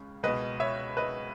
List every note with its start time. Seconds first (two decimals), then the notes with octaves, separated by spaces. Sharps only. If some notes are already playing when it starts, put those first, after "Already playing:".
Already playing: C#2 C#3
0.23 C#2 B2 B4 D#5
0.60 C#5 E5
0.97 B4 D#5